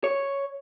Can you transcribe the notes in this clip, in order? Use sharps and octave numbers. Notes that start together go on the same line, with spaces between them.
C#5